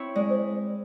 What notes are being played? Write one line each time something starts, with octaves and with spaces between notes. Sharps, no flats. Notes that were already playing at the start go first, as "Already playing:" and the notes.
Already playing: C4 E4 C#5
G#3 D5
C5